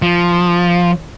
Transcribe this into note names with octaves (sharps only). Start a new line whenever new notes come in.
F3